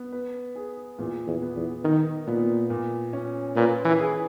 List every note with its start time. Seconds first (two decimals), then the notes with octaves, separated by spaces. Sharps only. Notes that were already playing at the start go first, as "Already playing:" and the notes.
Already playing: B3
0.12 B4
0.55 G#4
0.98 E2 A#2
1.27 E2
1.42 B3
1.56 E2
1.84 D#3 D#4
2.27 A#2 B3
2.70 A#2
3.13 C#4
3.56 A#2 B4
3.85 E3
3.98 G#4